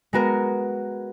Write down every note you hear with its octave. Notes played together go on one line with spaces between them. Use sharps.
G#3 B3 F#4 A#4